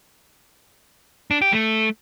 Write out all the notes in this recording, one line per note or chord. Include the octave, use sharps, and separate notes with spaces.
D4
G4
A3